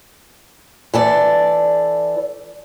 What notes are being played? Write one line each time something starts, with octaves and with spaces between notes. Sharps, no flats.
E3 A4 D5